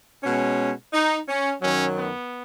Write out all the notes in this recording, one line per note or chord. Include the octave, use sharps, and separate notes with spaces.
B2 G#3 C#4
D#4
C#4
F#2 D#3 F#3 C#4
B3